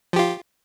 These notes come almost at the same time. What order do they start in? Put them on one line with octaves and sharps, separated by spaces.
F3 G4 F4